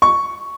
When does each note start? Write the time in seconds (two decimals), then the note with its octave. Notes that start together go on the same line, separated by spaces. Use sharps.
0.02 C#6